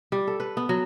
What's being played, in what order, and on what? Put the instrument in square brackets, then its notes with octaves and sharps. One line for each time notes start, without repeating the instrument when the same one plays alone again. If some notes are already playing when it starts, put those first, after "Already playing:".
[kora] G3
A4
B4
B3
F#3